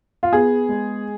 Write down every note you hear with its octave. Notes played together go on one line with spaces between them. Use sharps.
F4
B3 G#4
G#3